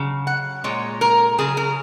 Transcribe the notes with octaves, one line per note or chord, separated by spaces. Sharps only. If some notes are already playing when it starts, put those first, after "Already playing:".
Already playing: C#3 F#3
F#5
A#2 G#3 C#5
A#4
C#3 F#3 G#4
A#4